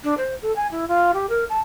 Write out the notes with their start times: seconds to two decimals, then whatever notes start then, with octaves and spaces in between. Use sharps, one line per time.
0.04 D4
0.18 C5
0.42 A4
0.56 G#5
0.71 E4
0.88 F4
1.14 G4
1.29 A#4
1.50 A5